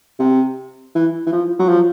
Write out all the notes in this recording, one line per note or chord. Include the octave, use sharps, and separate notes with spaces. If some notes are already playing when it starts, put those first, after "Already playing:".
C3
E3
E3
F3
F#3
F3